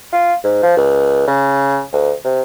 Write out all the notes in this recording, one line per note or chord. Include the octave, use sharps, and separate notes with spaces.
F4
G#2
F3
C#2
C#3
D2
C3